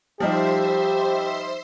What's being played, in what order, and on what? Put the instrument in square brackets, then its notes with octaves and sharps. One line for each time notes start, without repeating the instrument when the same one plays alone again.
[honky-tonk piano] F3 G3 D#4 [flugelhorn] G4 [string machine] C5 E5 C6